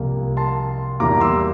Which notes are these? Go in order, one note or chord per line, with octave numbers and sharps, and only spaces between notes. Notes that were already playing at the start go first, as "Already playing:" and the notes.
Already playing: C2 C3 F3 A#3
A5 C6
E2 E3 G3 A#3 A#5 D6
C6 E6